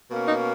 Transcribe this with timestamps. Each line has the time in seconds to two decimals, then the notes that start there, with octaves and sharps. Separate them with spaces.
0.10 B2 A#3 C#4
0.28 D#4